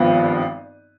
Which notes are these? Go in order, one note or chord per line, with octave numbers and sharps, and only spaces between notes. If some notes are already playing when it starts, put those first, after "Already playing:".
Already playing: G#1 G2 F3 B3